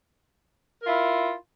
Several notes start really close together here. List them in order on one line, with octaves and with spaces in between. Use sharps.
A#4 F4 E4